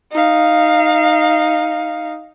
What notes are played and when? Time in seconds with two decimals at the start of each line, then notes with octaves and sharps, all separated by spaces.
0.12 D#4 F5